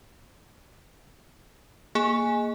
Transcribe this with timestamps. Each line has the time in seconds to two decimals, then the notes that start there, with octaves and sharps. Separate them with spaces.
1.95 A#3 G#4 G#5